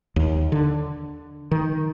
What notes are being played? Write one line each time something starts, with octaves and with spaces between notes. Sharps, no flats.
D#2
D3
D#3